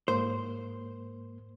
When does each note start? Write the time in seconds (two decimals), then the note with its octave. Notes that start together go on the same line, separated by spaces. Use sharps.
0.08 G#2 A#3 C5